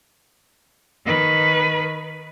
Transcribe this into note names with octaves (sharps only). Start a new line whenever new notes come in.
D#3 B4